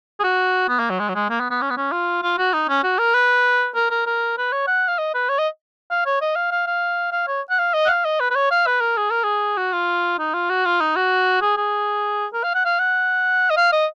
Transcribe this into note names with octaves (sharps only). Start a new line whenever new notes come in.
G#4
F#4
B3
A#3
F#3
G#3
F#3
G#3
A#3
B3
B3
C#4
B3
C#4
F4
F4
F#4
D#4
C#4
F#4
A#4
B4
A#4
A#4
A#4
B4
C#5
F#5
F5
D#5
B4
C#5
D#5
F5
C#5
D#5
F5
F5
F5
F5
C#5
F#5
F5
D#5
F#5
F5
D#5
B4
B4
C#5
F5
B4
A#4
G#4
A#4
G#4
F#4
F4
D#4
F4
F#4
F4
D#4
F#4
G#4
G#4
A#4
F5
F#5
F5
F#5
D#5
F5
D#5